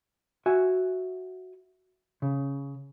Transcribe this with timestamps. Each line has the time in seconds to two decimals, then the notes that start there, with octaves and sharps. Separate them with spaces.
0.46 F#4 E5 G#5
2.22 C#3